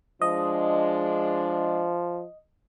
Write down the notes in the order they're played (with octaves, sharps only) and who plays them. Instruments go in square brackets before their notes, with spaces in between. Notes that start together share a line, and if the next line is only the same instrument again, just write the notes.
[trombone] F3 [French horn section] G#3 D4 [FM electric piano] D#5